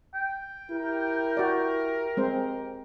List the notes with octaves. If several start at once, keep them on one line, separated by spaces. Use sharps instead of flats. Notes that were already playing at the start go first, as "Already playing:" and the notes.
G5
E4 G4 A#4
F#4 D5
G#3 C4 C5